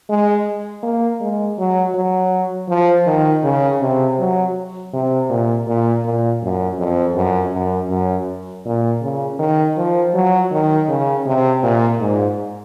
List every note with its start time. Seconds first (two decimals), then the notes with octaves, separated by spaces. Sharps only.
0.09 G#3
0.83 A#3
1.21 G#3
1.58 F#3
1.94 F#3
2.69 F3
3.06 D#3
3.43 C#3
3.81 C3
4.19 F#3
4.93 C3
5.30 A#2
5.67 A#2
6.05 A#2
6.42 F#2
6.79 F2
7.16 F#2
7.53 F#2
7.90 F#2
8.66 A#2
9.02 C#3
9.39 D#3
9.77 F3
10.14 F#3
10.51 D#3
10.89 C#3
11.26 C3
11.63 A#2
12.00 G#2